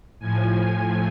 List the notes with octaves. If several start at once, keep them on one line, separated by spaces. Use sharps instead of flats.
A2 F3 G#5